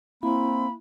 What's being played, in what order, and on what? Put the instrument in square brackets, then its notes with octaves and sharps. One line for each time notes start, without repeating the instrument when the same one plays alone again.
[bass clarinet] A#3 [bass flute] C4 [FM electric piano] E4 [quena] B5